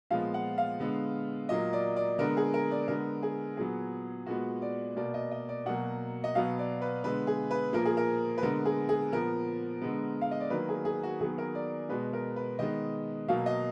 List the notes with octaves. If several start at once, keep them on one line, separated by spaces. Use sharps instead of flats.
A#2 F3 G#3 B3 F5
F#5
F5
D3 G#3 B3
A#2 F#3 A#3 D#5
D5
D5
D3 G#3 B3 A#4
G#4
A#4
D5
D3 G#3 B3 A#4
G#4
A#2 F#3 B3 G#4
A#2 G#3 B3 F#4
D5
B2 A#3 D5
D#5
D#5
D5
B2 F#3 A#3 F#5
D#5
B2 F#3 B3 F5
D5
B4
D3 G#3 B3 B4
G#4
B4
A#2 F3 A#3 A#4
G#4
A#4
B4
D3 G#3 B3 A#4
G#4
G#4
A#2 F3 B3 A#4
D3 G#3 B3
F5
D#5
D5
D#3 F#3 A#3 B4
G#4
G#4
F#4
D#3 F#3 B3 G#4
A#4
D5
B2 G#3 B3 B4
A#4
B4
D#3 G#3 B3 D#5
B2 F#3 A#3 F5
D#5